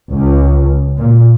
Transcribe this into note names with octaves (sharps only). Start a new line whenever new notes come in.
C#2
A#2